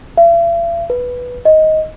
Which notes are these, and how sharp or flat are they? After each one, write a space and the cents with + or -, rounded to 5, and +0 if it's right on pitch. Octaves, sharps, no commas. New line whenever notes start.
E5 +45
B4 -5
D#5 +10